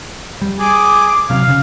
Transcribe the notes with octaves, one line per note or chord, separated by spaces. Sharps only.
G3
G#4 D6
C3 F#3 F5
C#3